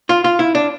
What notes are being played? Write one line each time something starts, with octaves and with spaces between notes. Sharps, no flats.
F4
F4
E4
D4